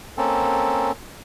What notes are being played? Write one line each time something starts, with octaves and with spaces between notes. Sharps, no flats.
A#3 C4 C#4 A4